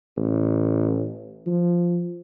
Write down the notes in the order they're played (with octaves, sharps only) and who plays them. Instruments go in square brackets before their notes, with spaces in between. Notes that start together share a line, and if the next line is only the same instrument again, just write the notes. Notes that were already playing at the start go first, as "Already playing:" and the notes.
[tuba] A1
F3